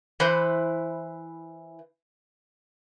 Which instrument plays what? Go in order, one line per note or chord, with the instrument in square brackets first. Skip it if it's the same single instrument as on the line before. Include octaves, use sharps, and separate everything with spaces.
[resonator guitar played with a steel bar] E3 E4 B4 C5